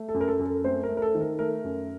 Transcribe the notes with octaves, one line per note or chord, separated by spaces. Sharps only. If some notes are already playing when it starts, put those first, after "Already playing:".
Already playing: A3
A4
F#2
A#4
A4
F#2
A4
A3 C4 C5
A#4
A3
A#4
A4
D#3
A#4
A3 A#4
F#2